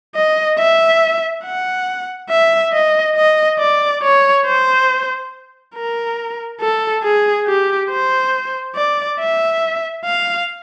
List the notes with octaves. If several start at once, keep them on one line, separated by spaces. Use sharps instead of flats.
D#5
E5
F#5
E5
D#5
D#5
D5
C#5
C5
A#4
A4
G#4
G4
C5
D5
E5
F5